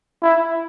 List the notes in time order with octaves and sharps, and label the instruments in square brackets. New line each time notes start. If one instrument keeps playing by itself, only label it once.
[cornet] E4